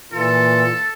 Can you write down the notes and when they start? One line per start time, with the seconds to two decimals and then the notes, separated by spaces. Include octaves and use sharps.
0.12 A#2 E3 F4 A4